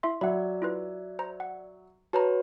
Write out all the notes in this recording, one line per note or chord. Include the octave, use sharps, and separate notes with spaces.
E4 E5 C6
F#3 D5 E5 F#5 B5
E4 F4 B4
C5 A#5
F#5
F#4 B4 C#5 A5 A#5